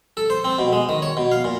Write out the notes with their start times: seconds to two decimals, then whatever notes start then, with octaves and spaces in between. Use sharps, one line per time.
0.17 A4
0.30 C5
0.45 C4
0.59 B2
0.73 G#3
0.89 D#3
1.02 C#5
1.17 B2
1.32 F5
1.44 A#2